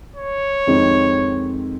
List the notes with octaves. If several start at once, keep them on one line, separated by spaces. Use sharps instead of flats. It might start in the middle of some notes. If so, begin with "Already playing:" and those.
C#5
F2 D#3 G#3 C4 D#4